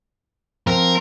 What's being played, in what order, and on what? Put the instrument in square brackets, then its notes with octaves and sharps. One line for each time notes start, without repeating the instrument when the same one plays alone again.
[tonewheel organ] F3 C4 [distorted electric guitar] A#4